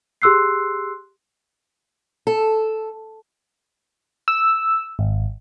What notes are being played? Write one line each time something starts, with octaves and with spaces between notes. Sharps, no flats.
G4 G#4 C6 E6 F#6 C7
A4
E6
G#1